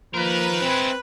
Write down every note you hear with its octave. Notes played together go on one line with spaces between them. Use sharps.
F3 A#3 D#4 A#4 B4
G#3 C4 E4